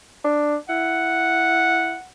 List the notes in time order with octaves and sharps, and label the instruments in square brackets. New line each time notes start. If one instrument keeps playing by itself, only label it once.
[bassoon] D4
[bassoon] E4 [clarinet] F#5